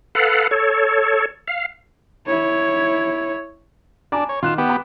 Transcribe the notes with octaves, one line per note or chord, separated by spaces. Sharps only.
A4 B4 F5 F#5
A4 C#5
F5
E4 C#5
D4 G#5 A#5 D6
C#5
D#3 F4 F#6 E7
B3 G4
B5